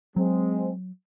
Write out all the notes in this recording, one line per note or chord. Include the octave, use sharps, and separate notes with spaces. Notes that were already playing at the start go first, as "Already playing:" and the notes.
F#3 G#3 C4